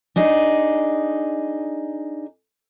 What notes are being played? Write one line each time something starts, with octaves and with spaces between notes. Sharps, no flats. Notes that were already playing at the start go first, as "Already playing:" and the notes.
D4 D#4 G#4